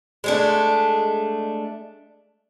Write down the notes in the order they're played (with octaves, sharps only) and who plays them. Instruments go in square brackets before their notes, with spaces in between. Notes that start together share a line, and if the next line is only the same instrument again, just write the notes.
[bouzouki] G#3 A3 D4